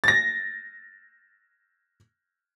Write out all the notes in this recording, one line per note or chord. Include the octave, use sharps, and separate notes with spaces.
A6 A#6